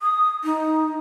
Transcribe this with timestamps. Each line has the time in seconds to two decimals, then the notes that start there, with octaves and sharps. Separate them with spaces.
0.01 D#6
0.44 D#4